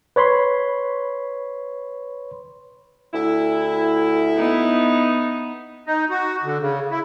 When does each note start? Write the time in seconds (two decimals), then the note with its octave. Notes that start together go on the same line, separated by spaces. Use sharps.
0.16 B4 C#5 B5 C6
3.14 D2 E4
4.37 B3 D#4
5.87 D#4
6.10 F#4
6.43 D3
6.60 C#3
6.91 E4